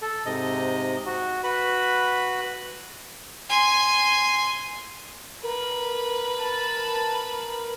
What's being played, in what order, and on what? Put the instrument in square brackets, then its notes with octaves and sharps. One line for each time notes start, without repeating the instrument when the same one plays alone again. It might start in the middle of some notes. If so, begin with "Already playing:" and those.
[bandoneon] A4
G#2 C3 D#5
F#4
F#4 B4 B5
[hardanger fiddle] G#5 C6
[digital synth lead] A#4 [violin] B4
[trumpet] A5